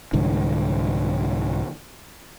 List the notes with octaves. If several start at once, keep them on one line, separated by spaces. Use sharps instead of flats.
C2 G#2 D3 E3